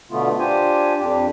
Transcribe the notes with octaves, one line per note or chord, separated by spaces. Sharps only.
B2 D3 A3 B3 F4
D4 F4 G4 C5 G#5
F2 D4 G4